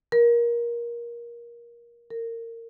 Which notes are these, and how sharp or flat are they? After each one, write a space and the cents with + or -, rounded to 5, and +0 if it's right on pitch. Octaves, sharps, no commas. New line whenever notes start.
A#4 +20
A#4 -25